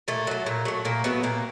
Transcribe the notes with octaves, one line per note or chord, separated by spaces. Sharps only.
A#2 A3
F#3 A3
A#2
F#3 A3
A#2 A#3
F#3 A3 B3
A#2 A#3